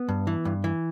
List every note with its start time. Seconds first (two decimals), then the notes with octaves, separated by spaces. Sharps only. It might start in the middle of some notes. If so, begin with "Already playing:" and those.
Already playing: B3
0.09 G2
0.27 E3
0.45 G2
0.64 E3